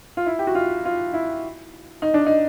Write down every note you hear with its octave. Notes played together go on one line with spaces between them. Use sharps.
F4
E4
G4
F#4
F4
F4
E4
D#4
D4
D#4